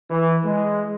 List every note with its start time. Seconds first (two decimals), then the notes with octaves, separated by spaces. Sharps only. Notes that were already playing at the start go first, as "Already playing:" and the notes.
0.10 E3
0.45 G#3